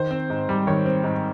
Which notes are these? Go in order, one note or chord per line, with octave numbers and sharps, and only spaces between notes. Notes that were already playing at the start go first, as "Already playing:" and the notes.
Already playing: D#3 C5
C4
G#2
G3
D#3 C#5
C4
G#2